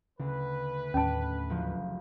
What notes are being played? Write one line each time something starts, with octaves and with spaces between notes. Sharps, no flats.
D2 C#3 B4
D#2 A2 C#4 D4 A5
F#1 F3